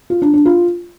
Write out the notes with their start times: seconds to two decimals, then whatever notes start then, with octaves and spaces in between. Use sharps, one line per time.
0.10 F4
0.22 D4
0.34 D4
0.45 F4